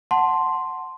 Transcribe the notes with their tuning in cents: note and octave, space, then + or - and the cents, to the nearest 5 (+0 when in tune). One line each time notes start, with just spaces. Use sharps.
F#5 +0 A5 +0 C6 +0